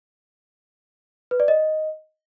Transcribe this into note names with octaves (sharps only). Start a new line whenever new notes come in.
B4
D5
D#5